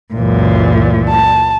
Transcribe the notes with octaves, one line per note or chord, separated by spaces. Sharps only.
C#2 F#2 A#2 E3
A5